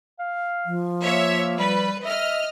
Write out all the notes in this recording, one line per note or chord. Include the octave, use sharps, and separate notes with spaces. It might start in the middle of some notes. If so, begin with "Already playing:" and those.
F5
F3
A#3 C#5 E5
G3 B4
D#5 E5 F6